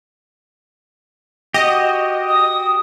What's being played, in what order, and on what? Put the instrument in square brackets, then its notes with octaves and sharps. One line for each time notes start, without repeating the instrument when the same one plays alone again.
[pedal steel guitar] F#4 G4 [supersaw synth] D#5
[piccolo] D#6